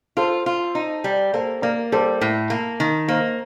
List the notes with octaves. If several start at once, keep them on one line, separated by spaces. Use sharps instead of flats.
F4 A4 C5
F4
D#4
G3
A#3 A4 C5
A#3 A#4 D5
G3 A4 C5
A2
A#3
D#3
A#3 C5 D#5